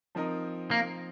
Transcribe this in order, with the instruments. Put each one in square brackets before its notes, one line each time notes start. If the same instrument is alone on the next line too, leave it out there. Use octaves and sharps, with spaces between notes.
[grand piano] F3 C4 D#4 A#4 D#5
[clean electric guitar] A#3